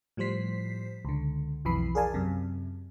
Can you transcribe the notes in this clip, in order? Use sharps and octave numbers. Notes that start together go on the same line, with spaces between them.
A2 F3 G3 C5 B6 C7
C#2 D3
B1 F2 E3 B5 C7
G#4 A#4 D5 F5 G#5 A5
F#2 C3